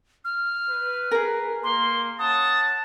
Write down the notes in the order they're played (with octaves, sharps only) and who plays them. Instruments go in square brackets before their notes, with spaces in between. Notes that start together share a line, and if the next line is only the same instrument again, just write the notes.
[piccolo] F6
[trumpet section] B4
[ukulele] G#4 A#4
[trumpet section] A#3 [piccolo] C6
[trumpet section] C#4 F#5 A5 [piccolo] D#6